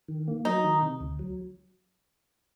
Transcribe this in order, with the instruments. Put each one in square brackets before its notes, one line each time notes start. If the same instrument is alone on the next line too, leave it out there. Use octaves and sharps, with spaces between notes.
[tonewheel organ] D#3
A#3
[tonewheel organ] F#3 [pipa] D#4
[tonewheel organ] D#3
C3
D2
F#3